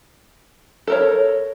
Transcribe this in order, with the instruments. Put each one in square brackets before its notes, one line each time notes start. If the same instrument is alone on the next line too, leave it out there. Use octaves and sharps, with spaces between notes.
[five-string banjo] A4 A#4 C#5